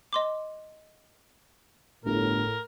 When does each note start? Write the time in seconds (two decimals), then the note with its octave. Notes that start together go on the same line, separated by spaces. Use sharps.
0.13 D#5 C6 D6
2.05 G1 A2 A#4